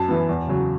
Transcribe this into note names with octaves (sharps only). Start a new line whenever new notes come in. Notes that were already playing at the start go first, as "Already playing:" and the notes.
Already playing: F#2 A5
E3 B3
E2
C#3 F#3